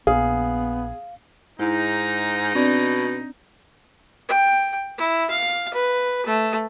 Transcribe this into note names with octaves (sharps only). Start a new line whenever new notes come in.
A#1 B3 G#4 F5
G#2 D#4 E4 G#4
B2 C4 D4 D5
G5
E4
F5
B4
A3